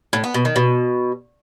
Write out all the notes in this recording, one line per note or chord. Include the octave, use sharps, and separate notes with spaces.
A2
B3
B2
D#3
B2